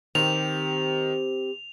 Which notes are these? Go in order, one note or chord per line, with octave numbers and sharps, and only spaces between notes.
D#3 C4 G4 F7